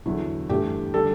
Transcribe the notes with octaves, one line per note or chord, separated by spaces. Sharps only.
E2 D3 F#3 E4
G2 E3 A3 G4
D3 G3 A4